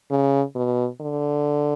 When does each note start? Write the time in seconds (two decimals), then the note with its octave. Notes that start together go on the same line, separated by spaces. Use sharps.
0.10 C#3
0.56 B2
1.01 D3